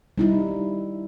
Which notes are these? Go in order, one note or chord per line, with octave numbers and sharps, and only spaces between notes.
G3 D#4 E4